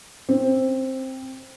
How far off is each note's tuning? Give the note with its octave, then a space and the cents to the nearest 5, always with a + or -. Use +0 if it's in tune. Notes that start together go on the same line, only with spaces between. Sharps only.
C4 +10